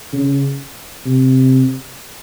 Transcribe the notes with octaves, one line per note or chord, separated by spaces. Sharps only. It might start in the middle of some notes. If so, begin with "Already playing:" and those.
C#3
C3